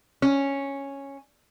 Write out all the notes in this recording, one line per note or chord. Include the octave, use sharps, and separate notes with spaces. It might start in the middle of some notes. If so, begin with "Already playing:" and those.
C#4